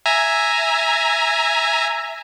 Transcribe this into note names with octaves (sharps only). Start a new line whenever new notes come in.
E5 G#5 A#5